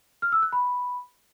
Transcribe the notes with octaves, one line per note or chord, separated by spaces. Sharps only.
F6
E6
F#6
B5